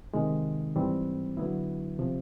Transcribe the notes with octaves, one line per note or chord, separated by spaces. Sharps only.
C3 D#3 G#3
G#2 E3 G3 C4
D3 F#3 B3 E4
C3 F3